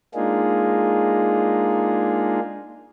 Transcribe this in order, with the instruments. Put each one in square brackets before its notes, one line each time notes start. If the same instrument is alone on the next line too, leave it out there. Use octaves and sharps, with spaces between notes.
[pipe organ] G#3 A#3 D4 D#4 F4 G#4